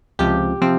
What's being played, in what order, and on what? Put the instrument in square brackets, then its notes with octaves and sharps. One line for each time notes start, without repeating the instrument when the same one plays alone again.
[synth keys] C#2 C3 F3 G4
C3 F3 C4